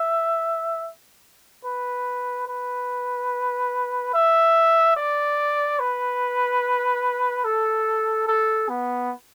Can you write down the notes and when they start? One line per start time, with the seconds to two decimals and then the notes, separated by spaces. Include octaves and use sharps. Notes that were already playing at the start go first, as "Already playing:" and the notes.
Already playing: E5
1.64 B4
2.47 B4
4.14 E5
4.96 D5
5.79 B4
7.44 A4
8.27 A4
8.69 B3